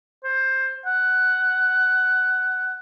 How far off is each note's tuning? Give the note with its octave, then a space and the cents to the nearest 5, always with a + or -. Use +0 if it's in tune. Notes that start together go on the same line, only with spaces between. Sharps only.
C5 +15
F#5 +10